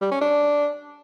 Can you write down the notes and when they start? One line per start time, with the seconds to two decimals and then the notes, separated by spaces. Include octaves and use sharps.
0.01 G3
0.11 C#4
0.21 D4